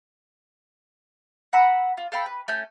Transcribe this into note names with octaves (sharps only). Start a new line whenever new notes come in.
F#5 A#5 B5 E6
F4
A4 F5 G5 B5
B4
A3 C#4 G6